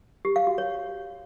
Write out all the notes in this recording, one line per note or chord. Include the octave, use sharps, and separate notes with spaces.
G4
F5
F#4
C#5